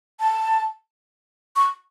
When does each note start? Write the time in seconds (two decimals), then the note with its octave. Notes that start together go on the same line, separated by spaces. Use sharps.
0.20 A5
1.56 C#6